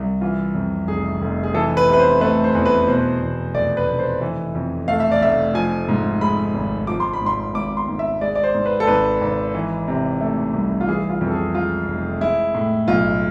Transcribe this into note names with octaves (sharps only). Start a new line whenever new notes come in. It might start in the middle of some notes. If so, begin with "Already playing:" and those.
Already playing: C2
E3 F4
F2
F1 G#4
F1
G#4
E3 A4
B4
C3
B4
C5
A3 B4
C5
E2
B4
B2 C5
E2
F1 D5
B4
F1
C5
E3
F2
A3 F5
E5
D5
F1 E5
F3 G#5
G#2
G#3 B5
G#1
F3 D6
C6
B5
G#2
C6
G#1 D6
C6
G#1
E5
G#3 D5
D5
C5
G#2
B4
A4
G#1 B4
G#1
E3
C3
A3
C2
F4
E3 G#4
F4
F2
A4
G#4
G#3 F4
F1
G#3 E4
A2
B1 F4